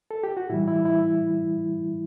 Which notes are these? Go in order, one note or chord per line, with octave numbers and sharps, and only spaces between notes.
A4
G4
F#4
A2 E3 G3 E4
E4
E4